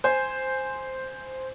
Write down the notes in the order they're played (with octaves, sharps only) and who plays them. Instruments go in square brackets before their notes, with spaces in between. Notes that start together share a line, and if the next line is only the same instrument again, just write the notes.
[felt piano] C5 G#5